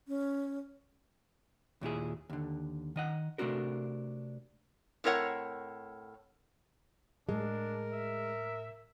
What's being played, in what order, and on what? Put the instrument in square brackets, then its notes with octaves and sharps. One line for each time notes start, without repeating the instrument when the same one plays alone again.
[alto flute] C#4
[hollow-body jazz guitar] D#2 A#2 E4 G#4
D#2 D3
D#3 D#5 F#5
C3 A3 C4 D4 F#4 A#4
[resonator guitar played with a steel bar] A2 C4 A#4 C#5 F#5
[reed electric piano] A2 [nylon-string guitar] G#3 [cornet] D4 [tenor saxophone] A#4
[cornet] E5